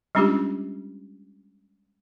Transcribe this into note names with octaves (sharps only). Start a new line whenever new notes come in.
G3 G#3 C#4 D4 F4 G4